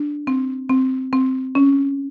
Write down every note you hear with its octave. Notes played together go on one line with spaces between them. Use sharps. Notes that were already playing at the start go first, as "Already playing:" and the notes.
Already playing: D4
C4
C4
C4
C#4